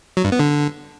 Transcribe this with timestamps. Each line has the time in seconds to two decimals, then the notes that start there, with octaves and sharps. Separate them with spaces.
0.17 F#3
0.24 G2
0.32 B3
0.39 D3